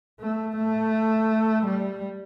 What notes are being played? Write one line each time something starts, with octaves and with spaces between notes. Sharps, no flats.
A3
A3
G3